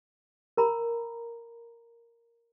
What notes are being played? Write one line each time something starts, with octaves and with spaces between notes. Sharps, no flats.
A#4 A#5 B5